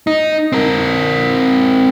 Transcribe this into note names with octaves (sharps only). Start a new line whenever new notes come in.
D#4
C4 A#4